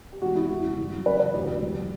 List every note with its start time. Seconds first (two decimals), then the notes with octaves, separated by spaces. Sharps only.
0.12 G4
0.22 E1 F#4
0.35 E1 E4
0.49 E3 F#4
0.64 C#3
0.78 G2
0.92 F#3
1.06 C#3 B4
1.20 E3 B4
1.34 D2 G4
1.49 E1
1.63 F#1